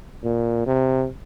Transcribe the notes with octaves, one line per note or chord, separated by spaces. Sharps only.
A#2
C3